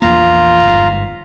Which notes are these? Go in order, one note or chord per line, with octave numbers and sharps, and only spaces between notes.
A#1 E2 A#3 F4 A#5
G1 G#2